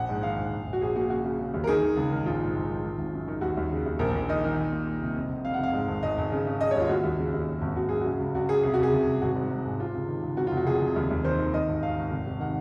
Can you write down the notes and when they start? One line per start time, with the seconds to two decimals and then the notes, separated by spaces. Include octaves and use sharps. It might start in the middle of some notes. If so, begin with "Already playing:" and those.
Already playing: A#1 F#5
0.09 G#2
0.23 D#3 F5
0.37 A#1
0.52 A#1
0.66 A#1
0.73 F#4
0.81 A#1 G#4
0.96 A#2 F#4
1.10 C#3 F#4
1.25 C#3
1.39 C#3
1.54 D#2
1.64 A#4
1.67 D#3 G#4
1.82 D#3
1.96 C#2
2.12 D#3
2.26 A#1 F4
2.40 G#2
2.55 A#1
2.69 D#3
2.84 D#3
2.98 G#1
3.13 F#2
3.28 D#3
3.41 D#2 F#4
3.57 D#2
3.71 C#3
3.86 D#2
3.99 A#1 A#4
4.15 A#1
4.29 D#3 D#5
4.44 D#3
4.57 A#2
4.72 A#2
4.87 A#2
5.01 C2
5.16 F2
5.30 F1
5.45 F2 F5
5.54 F#5
5.59 F1 F5
5.73 G#2
5.88 G#1
6.03 G#1 D#5
6.18 G#1
6.31 C#3
6.46 C#3
6.61 C#3 D#5
6.71 C#5
6.75 D#2 F4
6.89 D#2 F#4
7.03 D#2
7.18 C#3
7.34 D#2
7.47 F#2
7.61 G#1
7.76 G#1 F#4
7.89 F#2 G#4
8.01 C#3 F#4
8.19 C#2
8.35 C#2 F#4
8.49 C#3 G#4
8.63 C2 G#4
8.74 F#4
8.79 C2 G#4
8.93 C2
9.07 C2
9.22 G#1 F#4
9.36 G#2
9.50 G#2
9.65 G#2
9.80 C3 F4
9.94 C#2
10.08 D#3
10.23 C#2
10.37 F2 F#4
10.47 F4
10.51 F1
10.57 F#4
10.67 F1 G#4
10.81 F1
10.96 D#2
11.10 D#2
11.24 D#3 C5
11.39 D#3
11.53 D#3 D#5
11.68 G#1
11.83 G#1 F5
11.97 G#1
12.11 F1
12.26 C3
12.40 D#3 F#5